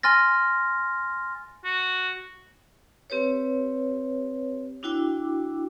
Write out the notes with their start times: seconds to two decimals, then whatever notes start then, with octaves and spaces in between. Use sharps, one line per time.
0.03 G#5 C6 F6 A6 A#6
1.64 F#4
3.10 C4 G4 B4 C#5
4.83 D4 E4 F#4 G5 D6 E6